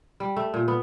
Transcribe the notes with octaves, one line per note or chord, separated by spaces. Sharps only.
G3
A3
A#2
B3